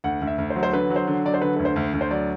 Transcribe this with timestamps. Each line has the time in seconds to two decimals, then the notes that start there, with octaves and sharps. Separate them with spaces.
0.04 D2 F#5
0.21 D2
0.27 E5
0.38 D2
0.50 C5
0.56 F#3
0.63 C5
0.73 D3 B4
0.90 F#3
0.96 C5
1.08 D3
1.25 F#3 D5
1.34 C5
1.41 D3 B4
1.57 D2 B4
1.65 C5
1.76 D2
1.94 D2
2.01 C5
2.11 F#3 D5